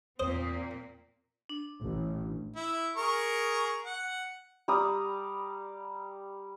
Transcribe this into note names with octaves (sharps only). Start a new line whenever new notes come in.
E2 A#2 A#3 C4 C5 D#6
D4
A1
E4
G#4 A#4 C#6
F#5
G3 D5 A#5 D#6